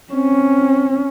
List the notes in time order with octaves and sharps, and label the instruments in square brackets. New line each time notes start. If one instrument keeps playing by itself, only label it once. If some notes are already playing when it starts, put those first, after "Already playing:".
[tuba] C4 [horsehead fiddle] C#4